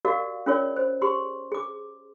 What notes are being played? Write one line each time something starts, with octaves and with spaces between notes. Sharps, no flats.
F#4 G4 A#4 D5 D#5 F5
C#4 F4 G#4 A#4 C#5 D5
C5
G4 G#4 C6
G#4 D6